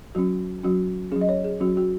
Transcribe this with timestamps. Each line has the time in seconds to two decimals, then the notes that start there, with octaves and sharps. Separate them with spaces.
0.15 F#3 C#4 F#4
0.63 F#3 C#4 F#4
1.11 F#3 C#4 G#4
1.21 D#5
1.29 C#5
1.44 G#4
1.60 F#3 C#4 F#4
1.77 F#4